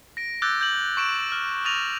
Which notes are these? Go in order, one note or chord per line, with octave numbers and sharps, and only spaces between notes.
A#6 D7
D6 E6 F#6 G6 A6
G6 F#7
C#6 D7 E7
F6
D6 D#6 A6 A#6 D#7 F7